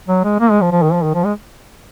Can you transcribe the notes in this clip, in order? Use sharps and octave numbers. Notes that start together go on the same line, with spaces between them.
F#3
G#3
A#3
G#3
F3
F3
D#3
F3
D#3
F3
G#3